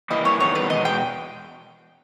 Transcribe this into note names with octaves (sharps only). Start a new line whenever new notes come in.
E3 G3 A#3 E4 D#5
C#5
E2 D#3 G3 B3 D#4 C#5
B4
E2 B2 G#3 D#5
G5